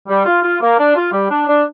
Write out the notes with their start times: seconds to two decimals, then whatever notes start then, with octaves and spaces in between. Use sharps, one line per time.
0.08 G3
0.26 F4
0.43 F4
0.61 A#3
0.78 D4
0.96 F4
1.13 G3
1.30 D4
1.47 D4